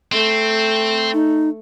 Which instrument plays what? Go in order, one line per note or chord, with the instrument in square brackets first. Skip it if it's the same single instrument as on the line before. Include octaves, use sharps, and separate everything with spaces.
[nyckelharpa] A3 [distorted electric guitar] C4
[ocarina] D#4